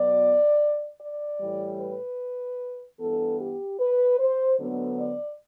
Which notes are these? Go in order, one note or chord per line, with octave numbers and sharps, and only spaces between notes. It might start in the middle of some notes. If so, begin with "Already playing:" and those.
Already playing: B2 F#3 B3 D5
D5
A2 E3 G3
B4
G2 E3 B3 A4
G4
B4
C5
D2 D3 F#3 B3
D5